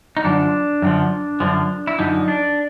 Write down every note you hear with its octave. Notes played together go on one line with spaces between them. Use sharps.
D#4
F#2 D3 F3 D4
F#2 D3 F3
F#2 D3 F3
E4
F#2 D3 F3 D#4
D4